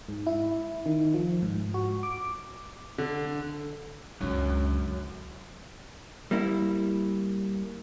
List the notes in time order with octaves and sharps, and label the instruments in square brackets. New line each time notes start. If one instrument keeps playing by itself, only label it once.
[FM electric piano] G#2
E4
D#3
F3
G#2
F#4
D6
[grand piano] D3
[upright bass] C#2 D3 [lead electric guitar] F#2
[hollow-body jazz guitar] G3 A#3 E4